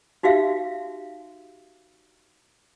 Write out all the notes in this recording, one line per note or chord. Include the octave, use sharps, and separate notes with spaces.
D#4 F#4 G4 E5 F5